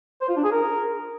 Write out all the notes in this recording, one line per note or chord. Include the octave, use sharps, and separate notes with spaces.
C5
F4
D4
G#4
A#4